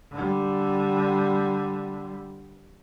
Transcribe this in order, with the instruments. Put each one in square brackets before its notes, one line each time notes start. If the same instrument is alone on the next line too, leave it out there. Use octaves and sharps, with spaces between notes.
[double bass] D3 G3